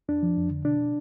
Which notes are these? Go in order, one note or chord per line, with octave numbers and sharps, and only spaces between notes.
F2 D4
F3
F2
D3
B2 D4